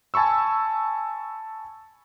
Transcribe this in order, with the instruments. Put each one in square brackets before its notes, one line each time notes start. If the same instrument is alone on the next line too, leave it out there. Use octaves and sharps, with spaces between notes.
[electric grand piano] G#5 A5 B5 C#6 E6